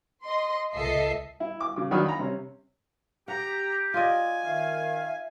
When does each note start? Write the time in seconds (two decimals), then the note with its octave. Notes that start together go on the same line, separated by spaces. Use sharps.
0.24 D#5 C6
0.73 C#2 A4 D#5 E5 C7
1.40 E4
1.60 D6
1.76 C#3 D6
1.91 D#3 F#3 D4 B5 D#6 F6
2.06 A#5 B5
2.19 C3 C#4
3.28 G4 F#5 A#5
3.94 F4 D5 D#5 G#5
4.45 D#3 E5 F5